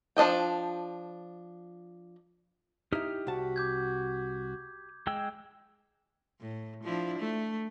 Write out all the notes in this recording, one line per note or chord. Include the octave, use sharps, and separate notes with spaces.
F3 D4 D#5 G5
D#4 E4 G4 D#6 F6
C2 F#4 F#5 A5
D6 G6 G#6
G#3 G5 E6
A2
F3 D4 E4
A3